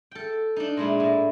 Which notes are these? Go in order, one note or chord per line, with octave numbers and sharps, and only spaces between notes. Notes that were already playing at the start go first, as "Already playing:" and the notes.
A4 G5
D4 D#4
A#2 G#3 E4
A2